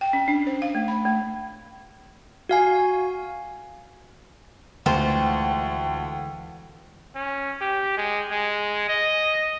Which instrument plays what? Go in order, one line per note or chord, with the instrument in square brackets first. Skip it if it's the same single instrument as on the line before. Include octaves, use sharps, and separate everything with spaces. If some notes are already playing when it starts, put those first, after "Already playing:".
[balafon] G5
C#4
D4
C5
F5
A3
B5
A3
[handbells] F#4 F5 G#5
[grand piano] D2 [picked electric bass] D3 E3 G#3 [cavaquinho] F4 C5 [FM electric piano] F#5 G5
[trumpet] C#4
G4
G#3
G#3
D#5